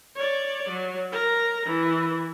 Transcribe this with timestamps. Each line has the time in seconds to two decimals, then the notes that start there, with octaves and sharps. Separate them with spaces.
0.15 C#5 D5
0.69 F#3
1.12 A#4 A#5
1.66 E3